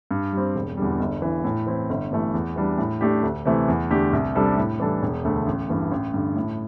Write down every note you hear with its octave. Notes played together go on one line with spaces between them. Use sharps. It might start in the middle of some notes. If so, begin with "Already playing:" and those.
G2
G3 C4
E1
E2 D3 G3
G1
G2 E3
A2
E3 C4 E4
G1
G2 E3 A3
E2
E3 G3 D4
A2
A3 D4 G4
D2
C3 E3 A3
E2
D3 A3 D4 G4
C2
C3 G3 D4 A4
A2
E3 G3 D4 A4
E1
D2 D3 A3
A1
G2 E3 A3
A1
G2 D3
A2